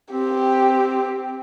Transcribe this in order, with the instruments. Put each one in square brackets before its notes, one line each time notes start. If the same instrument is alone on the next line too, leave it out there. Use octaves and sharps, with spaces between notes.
[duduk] C4 [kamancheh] G4